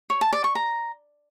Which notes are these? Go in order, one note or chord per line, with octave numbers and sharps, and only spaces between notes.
C#5
A5
D5
C#6
A#5